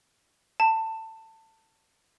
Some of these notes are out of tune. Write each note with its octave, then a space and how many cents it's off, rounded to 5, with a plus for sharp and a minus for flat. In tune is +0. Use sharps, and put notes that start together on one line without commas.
A5 +20